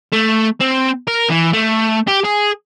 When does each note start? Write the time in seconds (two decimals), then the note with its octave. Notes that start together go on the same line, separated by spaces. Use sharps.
0.12 A3
0.60 C4
1.07 A#4
1.30 E3
1.53 A3
2.08 G4
2.24 G#4